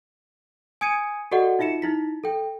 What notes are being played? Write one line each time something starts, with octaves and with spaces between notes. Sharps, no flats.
G#5 D#6 G#6 C#7 D#7
F#4 G#4 A4 D5 D#5 F#5
D#4 F4 E5 C#7 E7
D#4 E4 B6
A4 G5